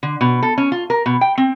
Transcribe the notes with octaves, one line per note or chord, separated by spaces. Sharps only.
D3
B2
A4
C#4
F4
A#4
B2
G5
C4